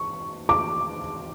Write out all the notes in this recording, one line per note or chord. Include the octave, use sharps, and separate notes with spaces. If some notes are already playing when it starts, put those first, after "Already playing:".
Already playing: C#6
D6